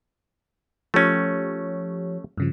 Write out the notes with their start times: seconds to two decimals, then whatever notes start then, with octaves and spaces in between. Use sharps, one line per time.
0.94 F3 A3 C#4 G4 C#5
2.37 G2 C#3 F3